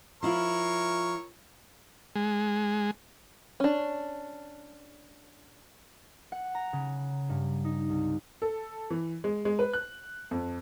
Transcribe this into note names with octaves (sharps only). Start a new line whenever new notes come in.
F3 E4 F4 A#4 C#5
G#3
C#4 D4
F#5
A#5
C#3
G2
D#4
C2
A4
E3
G#3
G#3
B4
F#6
F2